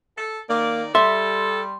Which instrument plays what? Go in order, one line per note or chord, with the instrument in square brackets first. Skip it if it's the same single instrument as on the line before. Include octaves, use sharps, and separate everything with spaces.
[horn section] A4
[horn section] D#3 D5 [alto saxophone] A#3
[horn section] G3 [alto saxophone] A4 [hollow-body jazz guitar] E5 [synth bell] C6